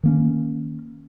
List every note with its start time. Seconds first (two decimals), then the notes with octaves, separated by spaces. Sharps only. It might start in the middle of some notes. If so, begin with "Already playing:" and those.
0.03 D#3 A#3 C#4